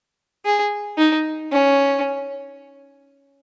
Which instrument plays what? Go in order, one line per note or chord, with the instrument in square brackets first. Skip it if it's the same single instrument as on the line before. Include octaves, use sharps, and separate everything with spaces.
[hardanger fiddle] G#4
D#4
C#4